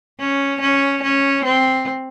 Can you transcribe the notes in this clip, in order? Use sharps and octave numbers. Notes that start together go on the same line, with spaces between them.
C#4
C#4
C#4
C4